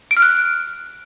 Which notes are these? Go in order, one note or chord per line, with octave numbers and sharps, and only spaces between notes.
D7
F6
F#6